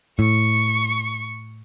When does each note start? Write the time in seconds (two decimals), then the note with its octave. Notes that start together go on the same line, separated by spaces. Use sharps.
0.19 A2 C#6